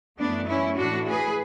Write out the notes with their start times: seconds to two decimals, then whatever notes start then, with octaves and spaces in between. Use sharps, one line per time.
0.19 F#2 E3 A3 B3 D4
0.48 C#4 E4
0.77 A2 E3 A3 D4 F#4
1.08 G#4 B4